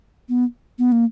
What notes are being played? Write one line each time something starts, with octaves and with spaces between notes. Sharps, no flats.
B3
B3
A#3